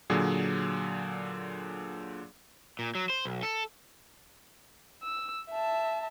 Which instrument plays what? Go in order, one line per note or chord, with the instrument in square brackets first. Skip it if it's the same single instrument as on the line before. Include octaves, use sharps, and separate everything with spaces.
[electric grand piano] A#2 D3 F#3 G#4
[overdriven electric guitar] A#2
F#3
C5
B1
A4
[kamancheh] E6
E5 A5